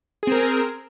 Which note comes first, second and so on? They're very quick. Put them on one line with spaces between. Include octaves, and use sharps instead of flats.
G#4 C4 A#4